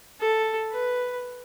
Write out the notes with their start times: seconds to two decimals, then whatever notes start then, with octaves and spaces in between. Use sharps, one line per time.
0.21 A4
0.71 B4